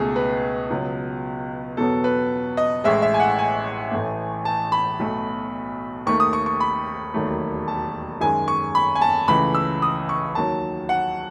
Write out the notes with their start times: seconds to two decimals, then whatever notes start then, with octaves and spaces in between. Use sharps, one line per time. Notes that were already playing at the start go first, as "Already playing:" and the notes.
Already playing: C#2 B2 A3 G#4
0.16 B4
0.70 C#2 B2 F#3 B3
1.77 E2 B2 F#3 B3 A4
2.04 B4
2.57 D#5
2.84 A1 A2 G#3 E5
3.02 E5
3.14 G#5
3.20 F#5
3.39 G#5
3.91 A1 A2 E3 A3
4.45 A5
4.72 B5
5.00 B1 B2 A3
6.06 D#2 D#3 A3 C#6
6.20 D#6
6.33 C#6
6.46 C#6
6.60 B5
7.14 E1 D#2 D#3 F#3 A3
7.68 A5
8.21 F#2 D#3 G#3 G#5
8.48 C#6
8.75 B5
8.95 G#5
9.02 A5
9.28 C#2 C#3 E3 A3 B5
9.55 E6
9.82 D#6
10.09 C#6
10.35 D#2 D#3 F#3 A5
10.89 F#5